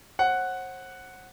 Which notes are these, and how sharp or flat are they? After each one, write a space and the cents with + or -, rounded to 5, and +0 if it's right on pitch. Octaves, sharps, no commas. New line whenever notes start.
C5 +40 F#5 +0